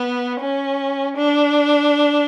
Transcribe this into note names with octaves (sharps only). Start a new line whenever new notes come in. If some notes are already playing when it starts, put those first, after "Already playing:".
Already playing: B3
C#4
D4